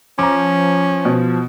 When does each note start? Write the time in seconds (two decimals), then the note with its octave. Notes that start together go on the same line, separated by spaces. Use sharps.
0.19 F3 C#4 A#5 D6
1.05 B2